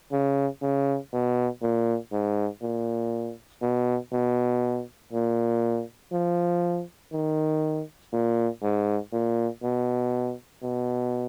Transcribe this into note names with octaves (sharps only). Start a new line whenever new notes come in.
C#3
C#3
B2
A#2
G#2
A#2
B2
B2
A#2
F3
D#3
A#2
G#2
A#2
B2
B2